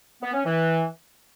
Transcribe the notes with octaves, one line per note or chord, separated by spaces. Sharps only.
B3
C#4
E3